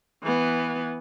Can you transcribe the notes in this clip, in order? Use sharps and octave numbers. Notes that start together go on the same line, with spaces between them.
E3 B3